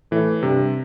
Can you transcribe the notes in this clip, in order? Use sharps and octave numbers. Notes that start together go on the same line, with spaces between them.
A2 E3
G2 C3